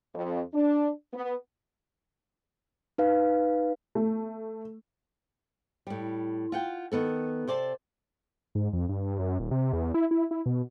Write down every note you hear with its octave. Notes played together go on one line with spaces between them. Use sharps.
F2
D4
B3
D#4 B4 F5
A3
A2 G3
F4 F#5 G5
D#3 B3 A4
C3 C5 D5 A5
G#2
F2
G2
F#2
D#1
C3
E2
E4
E4
E4
B2